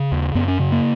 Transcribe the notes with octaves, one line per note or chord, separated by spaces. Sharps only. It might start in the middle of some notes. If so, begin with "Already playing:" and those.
Already playing: C#3
D#2
F#2 B3
C#4
C#3
A#3